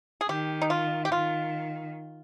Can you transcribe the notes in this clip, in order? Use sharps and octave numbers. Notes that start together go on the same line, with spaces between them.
G#4
D#3 G4
D#4
F4
G4
D#3 F4